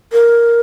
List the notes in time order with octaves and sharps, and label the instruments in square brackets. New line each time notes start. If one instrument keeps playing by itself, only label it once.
[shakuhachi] A#4